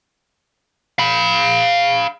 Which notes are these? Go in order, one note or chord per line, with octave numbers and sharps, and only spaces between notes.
F5 B5